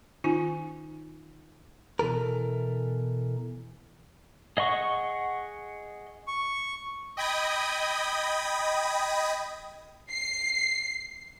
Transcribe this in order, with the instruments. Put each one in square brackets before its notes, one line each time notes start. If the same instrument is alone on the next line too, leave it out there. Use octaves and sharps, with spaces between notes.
[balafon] D#3 C#4 D#4 F4 G#5
[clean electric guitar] B2 E3 A4 A#4
[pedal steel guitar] G#4 D#5 F#5 C#6
[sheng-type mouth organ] C#6
[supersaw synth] D#5 G5 B5 D#6 G#6 A#6
[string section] C7